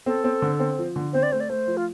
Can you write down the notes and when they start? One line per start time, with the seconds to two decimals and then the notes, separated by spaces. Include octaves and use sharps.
0.06 C4 A4
0.24 C4
0.42 D3
0.60 C4
0.79 F3
0.96 D3
1.13 C4 C5
1.23 D5
1.32 A3 C5
1.40 D5
1.49 A3 C5
1.67 F3
1.77 F4